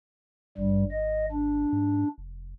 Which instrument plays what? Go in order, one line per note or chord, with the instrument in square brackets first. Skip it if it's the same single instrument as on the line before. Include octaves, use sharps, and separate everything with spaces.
[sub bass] G#1 [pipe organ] G2 G3
[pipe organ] D#5
D4
[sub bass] G#2
F1